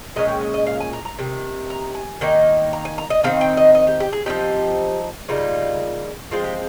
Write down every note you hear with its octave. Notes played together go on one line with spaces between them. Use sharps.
A#2 G#3 C#4 D#5
G5
D#5
D#5
F5
G#5
A#5
A#5
C3 D#3
A#5
G#5
D#3 A#3 D#4
A#5
G#5
A#5
D#5
D#3 G3 C4 D#4 F5
G5
D#5
D#5
G4
G4
G#4
F3 C4 D#4 G4
C#3 G3 A#3 D#4 F4
F3 G#3 C4 F4
G4